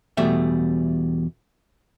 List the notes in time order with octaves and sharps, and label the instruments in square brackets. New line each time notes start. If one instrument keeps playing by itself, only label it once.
[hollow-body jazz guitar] E2 B2 G3 A3 E5